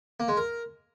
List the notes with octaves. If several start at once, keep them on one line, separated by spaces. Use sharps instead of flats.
A#3
G#3
A#4